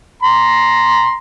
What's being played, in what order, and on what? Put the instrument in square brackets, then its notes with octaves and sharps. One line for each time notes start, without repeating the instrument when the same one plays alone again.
[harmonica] A#5 C6